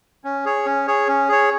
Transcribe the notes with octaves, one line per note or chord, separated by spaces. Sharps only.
C#4
G#4 C#5
C#4
G#4 C#5
C#4
G#4 C#5